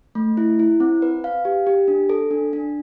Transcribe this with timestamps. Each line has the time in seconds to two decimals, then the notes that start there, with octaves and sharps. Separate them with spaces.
0.15 A3
0.37 E4
0.59 E4
0.80 C4
1.02 B4
1.24 F5
1.45 G4
1.67 G4
1.88 D4
2.09 A4
2.31 D4
2.53 D4